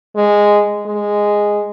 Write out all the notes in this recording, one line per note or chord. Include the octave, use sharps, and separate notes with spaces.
G#3
G#3